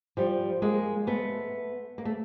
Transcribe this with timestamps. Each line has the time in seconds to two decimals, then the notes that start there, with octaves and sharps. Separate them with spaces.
0.17 F3 G3
0.62 G#3 A#3
1.07 A3 B3
1.98 A#3
2.05 A3